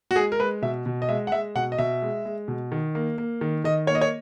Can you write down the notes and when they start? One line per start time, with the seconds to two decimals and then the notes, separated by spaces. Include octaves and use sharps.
0.11 F#4
0.16 G#3 G#4
0.32 A#4
0.39 G#3 B4
0.62 B2 E5
0.86 B2
1.02 D#5
1.09 G#3 E5
1.27 F#5
1.32 G#3 E5
1.55 B2 F#5
1.72 D#5
1.78 B2 E5
2.02 G#3
2.25 G#3
2.48 B2
2.72 D#3
2.95 A#3
3.18 A#3
3.41 D#3
3.64 D#3 D#5
3.87 A#3 C#5
3.95 D#5
4.01 C#5